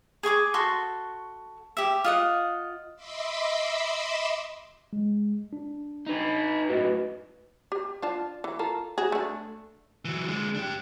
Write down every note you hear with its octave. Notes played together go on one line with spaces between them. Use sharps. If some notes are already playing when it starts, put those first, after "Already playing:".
G#4 G#5 C#6 D6
F#4 A4 C6 C#6
G4 E5
F4 D#5 F#5
D#5 E5 B5 C6 D6 E6
G#3
D4
D#4 B4
F#2 A2 F#4 B4 D#5
G4
D4 F4 A5
E3
F4 A4 A#4
F#4 G#4
A3 D4
E3 F#3
D3 G#3
D4 G4